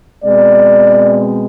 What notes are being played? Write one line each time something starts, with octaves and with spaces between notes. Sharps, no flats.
B2 G#3 C4 D5